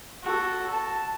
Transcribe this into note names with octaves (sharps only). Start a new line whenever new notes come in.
F#4 A4
A5